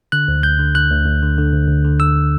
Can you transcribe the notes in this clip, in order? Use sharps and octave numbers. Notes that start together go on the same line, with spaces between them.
D3 F#6
D2
D2 G6
D3
D3 F#6
D2
D2
D3
D3
D2
D2
D3
D3 E6